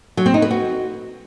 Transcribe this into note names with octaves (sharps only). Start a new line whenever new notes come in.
F#3
C4
D#4
B4
F#4